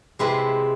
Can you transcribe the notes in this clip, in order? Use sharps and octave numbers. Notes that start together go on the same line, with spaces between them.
C3 G#3 C4 E4 B4